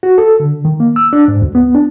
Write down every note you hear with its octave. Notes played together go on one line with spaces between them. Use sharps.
F#4
A4
D3
D#3
A#3
E6
D4
G#2
D2
B3
D4